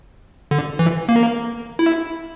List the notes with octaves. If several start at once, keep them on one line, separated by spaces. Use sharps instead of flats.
D3
E3
A#3
E4